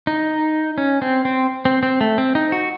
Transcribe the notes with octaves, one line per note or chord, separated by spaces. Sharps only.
D#4
C#4
C4
C4
C4
C4
A3
C4
D#4
F#4